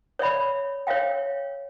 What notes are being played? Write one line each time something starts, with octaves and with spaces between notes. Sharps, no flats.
C#5 D5 E5 B5
C#5 E5 F5 G5